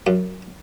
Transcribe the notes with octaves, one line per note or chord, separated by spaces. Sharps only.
F#2